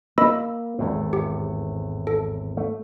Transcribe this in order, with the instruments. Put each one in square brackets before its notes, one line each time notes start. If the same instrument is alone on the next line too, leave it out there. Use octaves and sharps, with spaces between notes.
[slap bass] A#3 [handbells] D#5 B5 E6
[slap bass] G#1 E2 A2
[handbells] G4
A4
[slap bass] A3